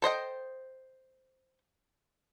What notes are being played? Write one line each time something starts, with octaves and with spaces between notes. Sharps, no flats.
A4 C5 D#5 G5